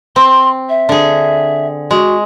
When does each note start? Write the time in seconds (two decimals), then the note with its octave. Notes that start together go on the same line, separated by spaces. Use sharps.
0.16 C4 C6
0.69 E5
0.89 D3 G#4
1.91 G#3 F#4